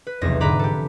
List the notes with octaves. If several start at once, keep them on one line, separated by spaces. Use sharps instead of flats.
B4
F1 B1 E2 A#6
G#2 D3 B4 A#5 B5 D6
G4 A4